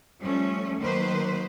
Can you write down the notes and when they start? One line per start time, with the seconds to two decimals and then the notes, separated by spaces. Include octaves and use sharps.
0.19 F3 G3 A3 C#4
0.78 D#3 F#3 A#3 B4 C5